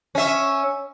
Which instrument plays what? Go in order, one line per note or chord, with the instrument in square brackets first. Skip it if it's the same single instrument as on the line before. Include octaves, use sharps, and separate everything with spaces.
[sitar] C#4 E5